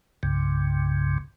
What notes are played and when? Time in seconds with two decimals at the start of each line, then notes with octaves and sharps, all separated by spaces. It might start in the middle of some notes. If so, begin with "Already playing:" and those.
0.23 C2 G2 C#3